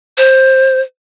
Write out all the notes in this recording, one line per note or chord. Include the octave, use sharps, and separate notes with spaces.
C5